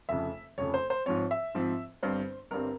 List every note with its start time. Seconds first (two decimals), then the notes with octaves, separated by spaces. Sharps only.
0.09 F1 F2 C#3 E5
0.58 F1 F2 C#3 C#5
0.74 C5
0.90 C5
1.06 G#2 F3 C4 C#5
1.31 E5
1.55 G#2 F3 C4
2.03 G1 G2 G3 C4 C5
2.51 G1 G2 G3 C4 A#4